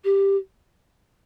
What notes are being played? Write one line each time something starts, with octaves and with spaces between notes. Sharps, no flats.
G4